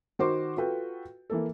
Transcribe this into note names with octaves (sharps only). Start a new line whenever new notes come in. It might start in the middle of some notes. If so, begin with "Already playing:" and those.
D#3 F#4 A#4 C5 C6 D6
F4 F#4 A4 B4 G5
E3 A#3 A4